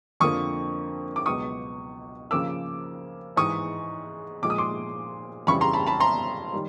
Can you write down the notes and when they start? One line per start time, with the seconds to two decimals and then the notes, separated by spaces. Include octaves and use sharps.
0.20 F2 D3 F3 A#3 C#6 D#6
1.16 D6
1.26 C#2 B2 F#3 B3 C#6 D#6
2.31 C#3 F3 A#3 D6 E6
3.36 G#2 E3 G#3 C#6 D#6
4.42 A#2 F3 G#3 D6
4.50 D#6
4.58 C6 D6
5.47 F2 C#3 E3 G3 B5 C#6
5.61 A#5 C6
5.73 A5 B5
5.87 A5 B5
6.00 A#5 C6
6.52 D#3 G3